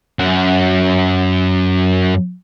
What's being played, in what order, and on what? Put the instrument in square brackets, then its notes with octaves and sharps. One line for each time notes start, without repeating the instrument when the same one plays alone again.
[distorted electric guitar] F#2 F#4